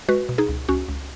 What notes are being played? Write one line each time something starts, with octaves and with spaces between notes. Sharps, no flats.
G#3 F#4 B4
B2
D#4 G#4
C#2
C#2 C#4 F#4
C#2